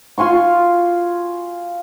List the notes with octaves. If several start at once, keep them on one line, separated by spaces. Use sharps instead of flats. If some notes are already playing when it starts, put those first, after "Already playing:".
F4 G#5 C6 C#6